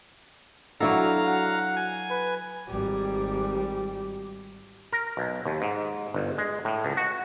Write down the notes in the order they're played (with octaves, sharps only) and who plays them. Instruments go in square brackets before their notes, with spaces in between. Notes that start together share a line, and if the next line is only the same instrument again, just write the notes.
[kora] F#3 E4 A4 [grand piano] D4 F#4 [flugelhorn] D5 [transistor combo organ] F5 A#5
[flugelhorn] F#5
[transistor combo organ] G#5
[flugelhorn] B4
[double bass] G#1 G3
[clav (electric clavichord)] A#4
B1
D#2
G#2
G1
G#3
A2
C#2
F#4